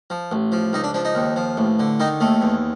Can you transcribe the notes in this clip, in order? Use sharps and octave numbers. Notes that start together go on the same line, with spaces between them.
F3
A1
F3
C#2 D#4
D4
F3 D4
D#4
D#2
F3
A1
D3
D#3 D#4
D#2 A3
E2